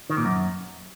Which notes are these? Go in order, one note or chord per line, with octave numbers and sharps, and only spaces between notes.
D#3
A#2
F#2